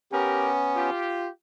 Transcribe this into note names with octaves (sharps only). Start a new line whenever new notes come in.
B3 C#4 G4 A#4
F4 G4